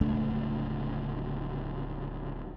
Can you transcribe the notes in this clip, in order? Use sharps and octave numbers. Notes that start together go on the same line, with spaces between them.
D1 C#2 A3 D4